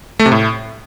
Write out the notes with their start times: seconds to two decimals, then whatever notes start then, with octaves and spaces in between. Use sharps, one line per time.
0.19 A3
0.26 C3
0.32 A2